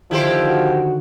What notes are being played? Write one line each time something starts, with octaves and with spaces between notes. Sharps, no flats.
D3 D#3 F3 E4 G4 C5
F#4